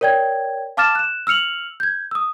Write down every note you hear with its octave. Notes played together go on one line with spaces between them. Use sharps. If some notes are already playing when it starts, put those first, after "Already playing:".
A#4 C#5 D5 G5 G#6
F5 A5 D6 F6 A6 E7
F#6 E7
E6 F6 C#7 F7 F#7
G6 G#6
D#6 E6